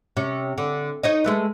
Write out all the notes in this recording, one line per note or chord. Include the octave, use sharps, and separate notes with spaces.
C3 C#4
D3
D#4 C#5 D#5
G#3 A3 B4